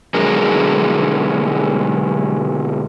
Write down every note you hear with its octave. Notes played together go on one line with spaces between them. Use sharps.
B2 D3 F#3 G#3 G#4 A#4